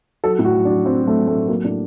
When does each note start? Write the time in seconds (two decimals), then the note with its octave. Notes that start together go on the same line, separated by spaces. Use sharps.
0.24 F#3 A4
0.39 A2
0.45 F#4
0.54 F#3
0.65 D4
0.70 F#3
0.86 F#3 C4
1.02 F#3
1.07 A3
1.18 F#3
1.27 A3
1.34 A2
1.48 F#3 A#3
1.64 A2 D4